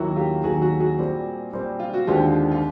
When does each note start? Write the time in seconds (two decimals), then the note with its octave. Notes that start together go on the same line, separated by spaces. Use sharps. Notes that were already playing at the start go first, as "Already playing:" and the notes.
Already playing: D#2 D#3 F#3 A#3 E4 F#4
0.16 F4 G4
0.43 D#2 D#3 F#3 A#3 F#4 G#4
0.62 F#4 G#4
0.80 F#4 G#4
0.98 A#2 G3 C4
1.53 A#2 G3 C4
1.79 F4
1.93 F#4
2.07 D#2 D3 F3 G#3 C4 F4 G4
2.51 F4